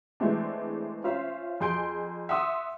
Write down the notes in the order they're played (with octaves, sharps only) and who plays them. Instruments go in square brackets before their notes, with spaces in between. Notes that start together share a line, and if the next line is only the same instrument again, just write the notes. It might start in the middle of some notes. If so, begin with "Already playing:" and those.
[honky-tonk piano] E3 G#3 A3 C4 D4
C#4 F4 C5 E5 F5
F2 G#4 C6 G6 D7
E5 F#5 C6 D#6 E6